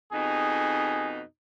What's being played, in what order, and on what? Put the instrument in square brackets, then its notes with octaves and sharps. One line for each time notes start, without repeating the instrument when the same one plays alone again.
[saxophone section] F2 B2 D#4 [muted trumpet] G#4